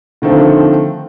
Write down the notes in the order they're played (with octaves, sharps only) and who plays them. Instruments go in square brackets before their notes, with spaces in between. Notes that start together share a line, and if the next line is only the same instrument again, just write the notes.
[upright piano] D3 D#3 F3 A3 C4